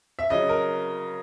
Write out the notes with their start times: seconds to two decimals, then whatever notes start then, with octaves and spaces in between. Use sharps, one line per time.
0.19 E5
0.30 C#3 F#3 D#5
0.49 A#4